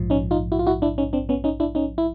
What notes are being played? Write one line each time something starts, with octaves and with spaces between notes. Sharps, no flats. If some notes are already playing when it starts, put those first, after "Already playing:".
Already playing: A#1 G#2 F3
C#4 D#4
D#4 F4
E4 F#4
F4
E4 F#4
D4 E4
C#4 D#4
C4 D4
B3 C#4
C#4 D#4
D4 E4
C#4 D#4
E4